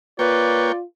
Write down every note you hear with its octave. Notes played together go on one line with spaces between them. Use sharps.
A#3 F4 B4 C#5 D5 G5